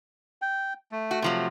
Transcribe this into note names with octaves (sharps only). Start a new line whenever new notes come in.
G5
A3
F#4
C3 F3 F#3